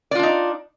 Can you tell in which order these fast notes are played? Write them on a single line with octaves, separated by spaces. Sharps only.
D5 F4 D4 D#4